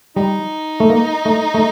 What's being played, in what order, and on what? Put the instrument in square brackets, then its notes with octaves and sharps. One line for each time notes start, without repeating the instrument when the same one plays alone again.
[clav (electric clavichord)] G3 [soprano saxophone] D#4
[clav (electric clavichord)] A3
A#3
A3
A3